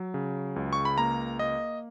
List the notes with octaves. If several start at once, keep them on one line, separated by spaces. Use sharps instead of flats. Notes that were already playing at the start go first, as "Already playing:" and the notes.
Already playing: F#3
C#3
C#2
C#6
B5
A#3 A#5
A#3 D#5